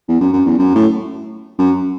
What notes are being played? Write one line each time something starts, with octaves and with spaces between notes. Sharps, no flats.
E2
F#2
F#2
E2
F#2
A2
F#2